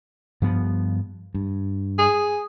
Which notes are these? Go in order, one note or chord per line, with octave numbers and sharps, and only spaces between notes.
G2 F3 B3
G2
G#4